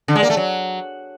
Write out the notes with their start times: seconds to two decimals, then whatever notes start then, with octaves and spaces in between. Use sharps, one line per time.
0.08 D3
0.15 G#3
0.23 A#3
0.30 A3
0.37 F#3